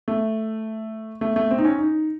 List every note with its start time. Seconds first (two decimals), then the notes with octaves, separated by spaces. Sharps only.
0.08 A3
1.21 A3
1.36 A3
1.51 C4
1.58 D#4
1.65 C#4
1.79 D#4